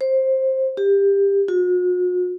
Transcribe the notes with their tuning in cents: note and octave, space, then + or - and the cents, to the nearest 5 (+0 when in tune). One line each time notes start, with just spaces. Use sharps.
C5 +15
G4 +20
F#4 -45